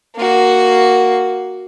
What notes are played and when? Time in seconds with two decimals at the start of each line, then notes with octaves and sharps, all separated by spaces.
0.16 A#3 F#4